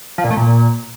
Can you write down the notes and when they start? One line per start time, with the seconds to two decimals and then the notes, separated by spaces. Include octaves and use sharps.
0.18 F3
0.24 A#2
0.31 A3
0.37 A#2